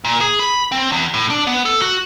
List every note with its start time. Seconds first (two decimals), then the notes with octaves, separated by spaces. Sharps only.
0.05 A#2
0.21 G#4
0.39 B5
0.72 C4
0.92 E2
1.14 A2
1.30 D4
1.47 B3
1.65 A4
1.82 F#4